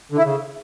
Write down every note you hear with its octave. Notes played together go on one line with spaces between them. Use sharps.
D3
E4
C#3